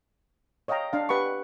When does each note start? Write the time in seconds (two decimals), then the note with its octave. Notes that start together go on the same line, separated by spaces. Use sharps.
0.68 C#5 D#5 F5 G5 A#5
0.93 D4 F5
1.09 G4 B4 F#5 B5 C#6